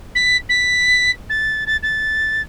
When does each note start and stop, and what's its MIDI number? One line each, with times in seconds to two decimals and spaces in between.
0.15 0.36 95
0.49 1.10 95
1.29 1.64 93
1.66 1.77 93
1.82 2.41 93